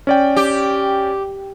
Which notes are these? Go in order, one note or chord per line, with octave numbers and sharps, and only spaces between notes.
C#4 D5 G5
G4